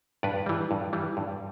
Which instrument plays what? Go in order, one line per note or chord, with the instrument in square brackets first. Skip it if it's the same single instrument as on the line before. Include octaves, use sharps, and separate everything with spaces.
[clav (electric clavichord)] G2 B4 D5
E3 G3
G2
E3 G3
G2